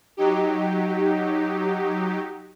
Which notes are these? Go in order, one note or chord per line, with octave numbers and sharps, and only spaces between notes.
F#3 D#4 G4